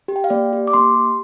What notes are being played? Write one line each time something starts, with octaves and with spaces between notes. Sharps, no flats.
G4
G5
F5
A#3 D5
G4
D6
A#3 C6
G4